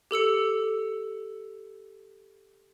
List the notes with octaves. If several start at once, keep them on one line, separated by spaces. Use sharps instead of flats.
G4 A4 E6 C#7